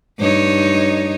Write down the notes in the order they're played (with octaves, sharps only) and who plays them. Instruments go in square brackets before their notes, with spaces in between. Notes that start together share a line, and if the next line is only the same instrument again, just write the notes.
[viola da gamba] G2 D#4 C#5